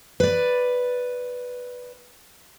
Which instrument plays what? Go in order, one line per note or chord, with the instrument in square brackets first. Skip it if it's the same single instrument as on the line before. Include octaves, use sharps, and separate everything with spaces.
[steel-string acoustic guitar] B4 D5